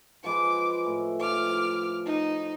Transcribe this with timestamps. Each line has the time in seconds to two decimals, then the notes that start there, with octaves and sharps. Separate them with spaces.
0.24 F3 G#3 B4 D6
0.86 A2
1.20 F3 D6 F6
2.06 D#4